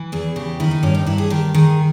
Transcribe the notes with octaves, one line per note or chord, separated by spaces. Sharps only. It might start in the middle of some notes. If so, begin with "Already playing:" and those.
Already playing: E3
E2 G#4
C#3 G4
D#3 E4
D#4
G2 C#4
D#4
G2 E4
G#4
D#3 G4
D#3 G#4